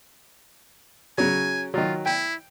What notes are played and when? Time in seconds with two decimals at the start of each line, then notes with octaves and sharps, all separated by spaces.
1.18 C#3 F#3 G#5
1.74 D#3 F#3 F4
2.06 E4 G5